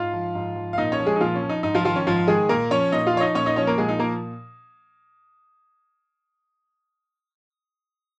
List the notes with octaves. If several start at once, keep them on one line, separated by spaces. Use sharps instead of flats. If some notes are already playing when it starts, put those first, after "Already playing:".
Already playing: G#2 F4 F5
F3
G#2
F3
F5
A#2 D#4 D#5
C#4 C#5
F3
G#3 G#4
D#4
A#2 F3 F4
C#4
F3
D#4
G#2 D#4
F3 F4
D#3 F3 F4
C#4
G#2 F3 F4
D#3 G#3 G#4
A#2 A#3 A#4
F3 C#4 C#5
A#2 D#4 D#5
F4 F5
F3 C#5
D#4 D#5
A#2 C#4 C#5
D#4 D#5
F3 C#4 C#5
A#3 A#4
A#2 G#3 G#4
D#4
F3 A#3 A#4